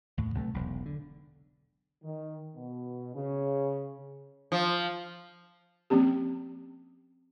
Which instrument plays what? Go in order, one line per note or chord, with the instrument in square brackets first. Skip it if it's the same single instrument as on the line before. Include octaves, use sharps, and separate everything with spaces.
[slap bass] D#2 A2
B1 C3 F#3 A3
E1 B1
D3
[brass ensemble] D#3
B2
C#3
[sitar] F3
[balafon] F3 A#3 C4 C#4 G4